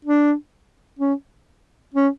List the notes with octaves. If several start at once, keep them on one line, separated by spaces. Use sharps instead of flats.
D4
C#4
C#4